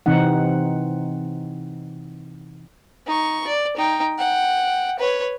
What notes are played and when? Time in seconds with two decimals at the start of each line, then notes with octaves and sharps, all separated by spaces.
0.06 C3 E3 C4 D#4 F#5
3.06 D#4 C#6
3.47 D5
3.77 D#4 G5
4.18 F#5 G5
4.99 B4 C#5